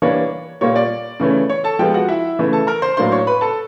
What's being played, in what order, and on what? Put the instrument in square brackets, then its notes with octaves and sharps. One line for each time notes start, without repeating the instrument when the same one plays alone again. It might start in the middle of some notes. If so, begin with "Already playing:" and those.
[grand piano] E3 G3 A#3 D4 C#5 C#6
A#2 G3 A#3 C#5 C#6
D5 D6
C#3 E3 A3 C#4
C#5 C#6
A4 A5
F3 G#3 B3 G4 G5
F#4 F#5
E4 E5
C#3 E3 A3
A4 A5
A#4 A#5
C5 C6
A2 F#3 A#3 D4 C5 C6
C#5 C#6
B4 B5
A4 A5